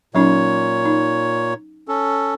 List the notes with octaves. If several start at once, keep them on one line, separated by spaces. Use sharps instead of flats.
A#2 F#3 C#4 D#4 C#5
D#4
C#4 A4